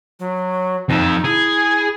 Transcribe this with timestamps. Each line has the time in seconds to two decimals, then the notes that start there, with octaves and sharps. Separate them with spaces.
0.19 F#3
0.90 F2 D#4 A4
1.25 E4 G#4